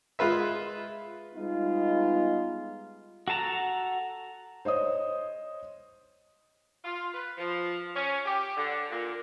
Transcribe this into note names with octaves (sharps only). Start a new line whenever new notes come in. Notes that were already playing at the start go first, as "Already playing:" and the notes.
G#3 F4 B4 E5
G3 G#3 B3 D#4 F4
F#4 A4 A5 A#5
C5 C#5 D#5 D#6
F4
B4
F3
C#4
G4
D3
A#2